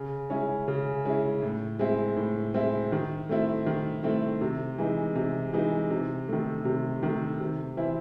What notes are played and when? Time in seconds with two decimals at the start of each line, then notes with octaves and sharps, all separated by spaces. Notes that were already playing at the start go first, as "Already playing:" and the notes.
Already playing: C#3
0.30 G#3 C#4 E4
0.68 C#3
1.05 G#3 C#4 E4
1.42 A2
1.79 G#3 C4 E4
2.17 A2
2.54 G#3 C4 E4
2.92 D#3
3.29 A3 C4 E4
3.66 D#3
4.03 A3 C4 E4
4.41 C3
4.78 E3 G#3 D#4
5.15 C3
5.53 E3 G#3 D#4
5.90 C3
6.28 D#3 A3
6.65 C3
7.03 D#3 A3
7.40 C3
7.77 E3 C4 E4